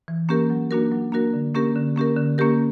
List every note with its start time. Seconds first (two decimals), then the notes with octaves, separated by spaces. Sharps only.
0.08 E3
0.29 A#3 C#4 G4 A#4
0.50 F#3
0.71 A#3 D4 F#4 A#4
0.92 F#3
1.12 A#3 D4 F#4 A#4
1.34 D3
1.54 A#3 C#4 G4 A#4
1.75 D3
1.96 A#3 C#4 G4 A#4
2.17 D3
2.38 A#3 C#4 G4 A#4